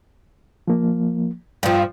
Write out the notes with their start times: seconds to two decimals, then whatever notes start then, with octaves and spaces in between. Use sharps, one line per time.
0.68 F3 A#3
1.63 G2 F3 G5